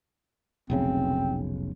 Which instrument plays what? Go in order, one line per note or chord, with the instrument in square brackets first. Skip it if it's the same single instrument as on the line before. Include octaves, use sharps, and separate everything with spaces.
[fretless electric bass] F1 B1 C#3 [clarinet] C4